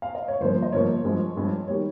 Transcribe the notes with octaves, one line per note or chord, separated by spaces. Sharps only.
F5
D#5
C#5
G1 G2 F3 A#3 C5
D#5
G1 G2 F3 A#3 C#5
G2 F3 G#3
G2 F3 G#3
D#3 G3 C#5